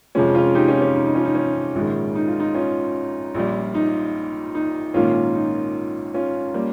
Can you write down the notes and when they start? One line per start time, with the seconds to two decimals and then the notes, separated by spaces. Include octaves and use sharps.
0.15 F2 C3 F3 G#3 C#4
0.35 C#4 F4
0.55 D#4 G4
0.68 C#4 F4
0.82 C#4
0.95 D#4
1.05 D#4
1.15 C#4 F4
1.25 D#4
1.35 C#4
1.75 A#1 G#2 D#3 G#3
2.15 D#4
2.27 F4
2.40 D#4
2.54 C#4 F4
3.34 A#1 A#2 G3
3.74 D#4
4.55 D#4
4.94 A#1 G#2 D#3 A#3 C#4 F4
5.34 D#4
6.14 C#4 F4
6.54 G3 A#3